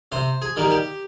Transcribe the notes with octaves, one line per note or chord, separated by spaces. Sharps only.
C3 C5
G#4
D#3 G3 A#3
G4